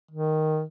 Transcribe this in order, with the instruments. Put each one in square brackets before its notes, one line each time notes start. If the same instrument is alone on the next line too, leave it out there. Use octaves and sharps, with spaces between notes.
[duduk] D#3